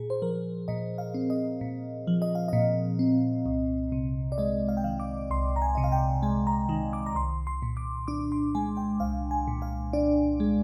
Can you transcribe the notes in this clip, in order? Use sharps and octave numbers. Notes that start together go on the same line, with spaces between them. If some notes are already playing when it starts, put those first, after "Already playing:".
Already playing: A#2 G#4
C5
F3 A#4
A#2 D#5
F5
C4
D#5
A#2
F3
D#5
F5
A#2 D#5
C4
C2
C3
D5
G#3 D#5
F5
G5
D#3 F5
D6
C2 C6
A#5
G#5
C3 D#5
F5
G5
G#3 G#5
A#5
D#3
D6
A#5
C2 C6
C6
A#2
D6
D4 D6
C6
G#3 G#5
G5
C2 F5
G#5
A#2
F5
D4 D5
G#3